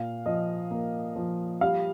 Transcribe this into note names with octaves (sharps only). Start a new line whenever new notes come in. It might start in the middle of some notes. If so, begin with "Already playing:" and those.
Already playing: A#2 F5
F3 D#5
A#3
F3
G3 F5